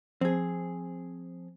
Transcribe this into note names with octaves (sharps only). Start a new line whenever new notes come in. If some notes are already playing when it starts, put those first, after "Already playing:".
F3 C4 G#4